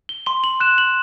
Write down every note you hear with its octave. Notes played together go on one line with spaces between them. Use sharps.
G7
C6 G7
F#7
F#6 E7
F#7